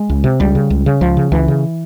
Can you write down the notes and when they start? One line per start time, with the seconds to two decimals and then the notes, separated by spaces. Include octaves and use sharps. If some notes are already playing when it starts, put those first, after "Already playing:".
Already playing: G#3
0.10 C#2
0.24 C3
0.40 C#2 G3
0.55 C#3
0.70 C#2
0.86 C#3
1.01 C#2 F3
1.17 C#3
1.32 C#2 E3
1.48 C#3